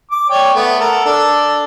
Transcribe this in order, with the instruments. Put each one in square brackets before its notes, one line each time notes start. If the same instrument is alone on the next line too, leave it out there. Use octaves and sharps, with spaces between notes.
[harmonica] D6
C#5 D5 G5
A3 B3
A4 A#4 F#5
D4 A4